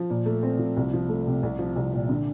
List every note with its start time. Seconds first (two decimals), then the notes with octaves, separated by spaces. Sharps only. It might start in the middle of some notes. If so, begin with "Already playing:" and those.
Already playing: F3
0.10 A#2
0.26 A3
0.43 C4
0.59 F3
0.77 C2
0.93 F3
1.09 A3
1.26 C3
1.43 C2
1.59 F3
1.76 C2
1.93 A#2
2.09 D3